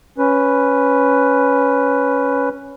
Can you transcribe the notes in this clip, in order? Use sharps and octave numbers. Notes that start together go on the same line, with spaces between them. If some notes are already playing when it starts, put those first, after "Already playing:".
C#4 B4